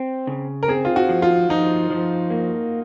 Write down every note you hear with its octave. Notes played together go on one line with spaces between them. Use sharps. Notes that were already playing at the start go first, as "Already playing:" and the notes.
Already playing: C4
C#3
A#4
C4 G#4
F4
F#4
F3
F4
F3 D#4
F3
A#3